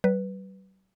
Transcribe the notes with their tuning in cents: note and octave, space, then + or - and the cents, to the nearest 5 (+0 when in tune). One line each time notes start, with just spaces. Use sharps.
G3 -45 B4 +0